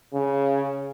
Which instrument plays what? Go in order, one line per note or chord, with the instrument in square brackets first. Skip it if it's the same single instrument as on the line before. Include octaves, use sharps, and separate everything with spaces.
[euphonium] C#3